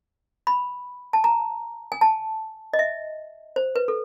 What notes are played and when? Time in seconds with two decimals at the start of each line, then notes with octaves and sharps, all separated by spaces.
0.47 B5
1.13 A5
1.24 A#5
1.92 G#5
2.01 A5
2.74 D#5
2.79 E5
3.56 C5
3.76 B4
3.88 A4